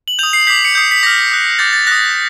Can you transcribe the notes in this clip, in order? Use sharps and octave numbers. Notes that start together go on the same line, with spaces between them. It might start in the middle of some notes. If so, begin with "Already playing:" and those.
F#7
D#6 G6 F7
C7
D6 G6 B6
C#7
D#6 G6 C7
B6
D6 F6 A#6
D#6 F#6
D6 G6 A6
A6
D#6 F#6 A#6